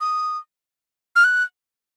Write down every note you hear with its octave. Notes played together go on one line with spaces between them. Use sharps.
D#6
F6
F#6